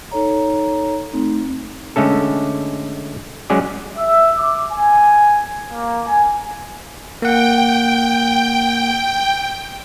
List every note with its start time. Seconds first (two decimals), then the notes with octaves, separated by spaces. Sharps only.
0.11 D#4 A4 C#5 A#5
1.13 A3 C4 D#4
1.96 D3 G#3 A3 C#4 A4
3.50 F#3 G#3 C#4 G#4 D5
3.96 E5
4.37 D6
4.71 G#5
5.73 A#3
6.07 G#5
7.22 A#3 F#5 G5